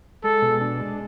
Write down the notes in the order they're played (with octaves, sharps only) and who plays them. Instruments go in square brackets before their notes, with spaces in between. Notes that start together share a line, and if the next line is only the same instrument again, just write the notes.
[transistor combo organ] G#3 [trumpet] A4
[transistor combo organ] B2
D4
G#3